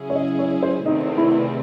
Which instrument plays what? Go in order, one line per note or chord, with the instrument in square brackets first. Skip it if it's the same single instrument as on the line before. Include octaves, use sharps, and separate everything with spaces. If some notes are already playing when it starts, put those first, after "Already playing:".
Already playing: [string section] C#3 F#3 C#4 E4 G#4
[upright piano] C#5
D#5
C#5
C5
[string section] E2 C3 D#3 A3 C4 [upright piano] D#4
[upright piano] E4